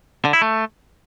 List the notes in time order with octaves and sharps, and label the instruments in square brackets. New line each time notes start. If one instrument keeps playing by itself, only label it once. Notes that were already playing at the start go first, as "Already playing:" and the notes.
[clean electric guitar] D3
E4
A3